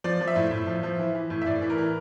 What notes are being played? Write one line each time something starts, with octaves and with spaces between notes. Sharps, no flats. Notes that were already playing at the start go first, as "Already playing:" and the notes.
F3 D5
F3
E5
A2
A2
F3
F3
E3
E3
A2
E5
A2 D5
E3
A#4
E3